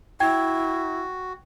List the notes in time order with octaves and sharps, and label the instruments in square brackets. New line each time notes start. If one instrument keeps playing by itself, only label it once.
[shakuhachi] E4 [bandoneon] F#4 [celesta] G5 G#6